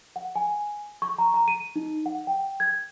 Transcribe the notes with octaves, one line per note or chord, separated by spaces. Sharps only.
F#5
G#5
C#6
A#5
A#5
D#7
D#4
F#5
G5
G#6